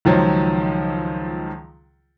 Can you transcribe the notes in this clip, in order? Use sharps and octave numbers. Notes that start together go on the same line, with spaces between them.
C#2 D#3 F3 F#3